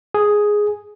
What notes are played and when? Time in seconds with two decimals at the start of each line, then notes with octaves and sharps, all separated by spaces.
0.14 G#4